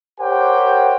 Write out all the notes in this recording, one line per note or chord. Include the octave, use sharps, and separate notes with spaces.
G4 A#4 C5 C#5 F#5 G5